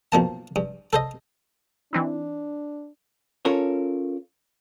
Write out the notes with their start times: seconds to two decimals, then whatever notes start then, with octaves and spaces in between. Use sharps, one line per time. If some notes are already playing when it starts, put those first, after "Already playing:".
0.12 B1 F3 A#3 A5
0.56 G2
0.93 A4 C5 D#5
1.93 E3 C4 D4 D#4
3.45 C#4 F4 A4 A#4 C#5